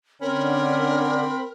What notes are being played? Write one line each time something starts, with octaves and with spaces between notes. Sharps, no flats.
D3 C4 C#4 A#4 B5